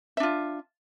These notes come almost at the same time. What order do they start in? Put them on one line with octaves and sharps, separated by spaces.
E5 D4 F4